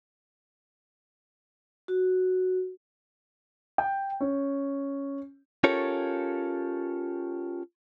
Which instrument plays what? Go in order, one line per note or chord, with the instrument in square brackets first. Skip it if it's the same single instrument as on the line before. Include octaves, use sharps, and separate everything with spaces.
[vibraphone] F#4
[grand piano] G5
C#4
[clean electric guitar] C#4 F4 G4 A4 A#4 C#5